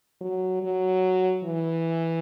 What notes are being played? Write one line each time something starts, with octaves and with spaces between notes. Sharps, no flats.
F#3
F#3
E3